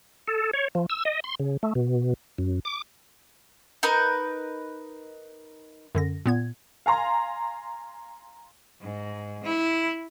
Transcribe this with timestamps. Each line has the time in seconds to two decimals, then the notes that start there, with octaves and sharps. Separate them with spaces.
0.28 A4
0.53 C#5
0.75 F3
0.90 E6
1.05 D#5
1.24 C6
1.40 C#3
1.63 A3
1.75 B2
2.38 F#2
2.65 D6
3.83 D#4 A#4 B4
5.95 F#2 D3 A#6
6.26 A#2 B3 G#6
6.86 F5 G#5 A#5 C6
8.82 G#2
9.44 E4